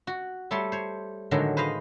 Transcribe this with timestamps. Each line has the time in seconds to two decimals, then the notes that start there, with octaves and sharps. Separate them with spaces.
0.07 F#4
0.51 G3 A3 A4 C#5 A5 C6
0.72 C5 C#5
1.31 A2 D3 D#3 F#3 G#3
1.57 B4 C5 D#5 F5